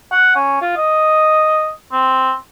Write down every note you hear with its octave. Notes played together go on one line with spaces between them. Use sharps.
F#5
C#4
F4
D#5
C4